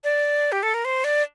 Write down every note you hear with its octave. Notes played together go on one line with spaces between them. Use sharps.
D5
G4
A4
A#4
C5
D5